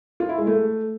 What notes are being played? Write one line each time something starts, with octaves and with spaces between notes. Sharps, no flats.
F4
E4
G#3
A3